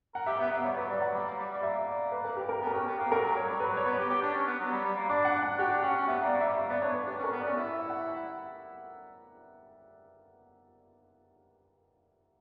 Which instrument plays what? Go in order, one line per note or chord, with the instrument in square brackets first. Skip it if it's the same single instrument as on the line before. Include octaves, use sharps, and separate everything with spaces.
[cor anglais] A#4 [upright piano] F#5
[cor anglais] G4 [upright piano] E5
[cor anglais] B3 [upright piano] E5
[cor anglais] A#3 [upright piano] E5
[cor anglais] G3 [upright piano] C#5
[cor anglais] F#3 [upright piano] B4
[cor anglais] G3 [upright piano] D5
[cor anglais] F#3 [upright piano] F#5
[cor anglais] G3
A#3
G3
G3
[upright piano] D5
[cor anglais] A#3 [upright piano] E5
[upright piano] D5
B4
A#4
G4
A#4
[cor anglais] B3
[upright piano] A#4
[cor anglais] C#4 [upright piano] G4
[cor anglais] B3
[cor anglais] A#3 [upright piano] G4
[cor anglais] F#3 [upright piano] A#4
[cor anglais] F#3
[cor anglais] F#3 [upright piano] C#5
[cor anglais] G3
[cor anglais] F#3 [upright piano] B4
[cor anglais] G3
[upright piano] C#5
[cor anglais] B3
[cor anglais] G4 [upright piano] C#5
[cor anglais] G4
D4
C#4
B3
F#3
G3
G3
A#3
[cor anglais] D4 [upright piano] D5
[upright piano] F#5
F#5
[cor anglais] F#4 [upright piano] G4
[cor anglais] D4
[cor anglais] C#4 [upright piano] F#5
[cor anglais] C#4
[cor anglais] B3 [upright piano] E5
[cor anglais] A#3
[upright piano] D5
[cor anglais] A#3
[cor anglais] G3 [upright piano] E5
[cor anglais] A#3 [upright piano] E5
[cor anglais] B3 [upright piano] D5
[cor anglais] D4 [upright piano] C#5
[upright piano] B4
[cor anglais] D4 [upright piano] G4
[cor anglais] C#4
[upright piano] A#4
[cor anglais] B3
[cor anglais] C#4 [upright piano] D5
[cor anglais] E4 [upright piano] D5
[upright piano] E5
F#5